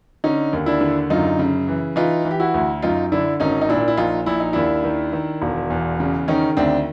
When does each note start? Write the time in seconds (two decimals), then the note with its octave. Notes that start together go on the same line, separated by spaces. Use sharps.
0.24 D3 C#4 D#4
0.53 D#2
0.66 D4 E4
0.81 D3
1.10 F#2 D#4 F4
1.39 C#3
1.68 E3
1.96 E3 D#4 F4
2.25 E3
2.31 G4
2.40 E4 F#4
2.54 D2
2.82 F#2 D#4 F4
3.12 D3 D4 E4
3.40 G#1 C#4 D#4
3.61 D#4
3.69 A#2 D4 E4
3.88 E4
3.97 A#1 D#4 F4
4.26 A#1 E4
4.40 D#4
4.53 D#2 D4 E4
4.84 D#3
5.13 D#3
5.42 E1
5.70 E2
6.00 C#3
6.28 D#3 C#4 D#4
6.57 D2 C4 D4